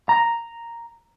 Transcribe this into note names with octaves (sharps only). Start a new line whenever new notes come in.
A#5